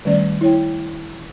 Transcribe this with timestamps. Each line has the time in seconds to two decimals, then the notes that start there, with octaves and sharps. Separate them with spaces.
0.05 D#3 G3 A3 C#4 D5
0.41 E4 C#5 G5